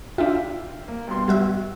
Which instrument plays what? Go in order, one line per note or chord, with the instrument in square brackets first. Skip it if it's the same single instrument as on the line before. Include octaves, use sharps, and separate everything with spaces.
[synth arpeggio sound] D4 F4 [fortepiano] E5 F5 G5
[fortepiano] A#3
G2 B2 C6
[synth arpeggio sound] G3 F#4 E5